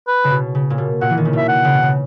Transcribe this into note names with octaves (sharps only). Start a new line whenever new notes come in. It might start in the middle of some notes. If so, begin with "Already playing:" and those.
B4
C#3
B2
C#3
A#2
B2
A#2 F#5
E3
D#3
C#3
B2 E5
F#5
C#3
B2
C#3